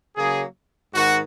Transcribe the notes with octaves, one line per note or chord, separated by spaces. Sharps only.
C#3 F#3 A#3 G#4
G#2 D#3 F#4